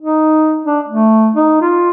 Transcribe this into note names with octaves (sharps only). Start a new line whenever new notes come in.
D#4
D4
A3
D#4
F4